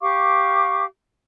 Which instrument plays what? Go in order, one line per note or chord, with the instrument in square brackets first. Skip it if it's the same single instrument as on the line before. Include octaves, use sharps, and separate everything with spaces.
[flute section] G4 F5 C#6 D6